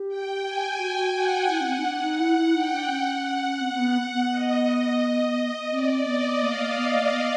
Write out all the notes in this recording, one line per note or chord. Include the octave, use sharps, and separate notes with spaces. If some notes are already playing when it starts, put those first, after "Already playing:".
Already playing: G4
G5
G#5
F#4 G5
F#5
E4
C#4
C4
D#4
D4
D#4
E4 F#5
E4
D#4 G5
D4
C#4 F#5
C4
C4
B3
B3
D#5
C4 D5
B3 D#5
A#3 F5
A#3
B3
A#3
B3